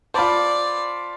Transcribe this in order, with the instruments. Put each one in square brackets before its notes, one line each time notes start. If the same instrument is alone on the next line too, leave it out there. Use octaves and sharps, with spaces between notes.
[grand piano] F4 C5 [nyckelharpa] D5 [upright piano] A5 B5